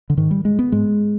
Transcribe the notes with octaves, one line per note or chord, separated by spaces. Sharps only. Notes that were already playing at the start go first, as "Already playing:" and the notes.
D3
G#2 D#3
G3
G#3
B3
G#2 G#3